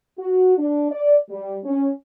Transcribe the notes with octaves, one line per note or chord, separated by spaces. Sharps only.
F#4
D4
D5
G3
C#4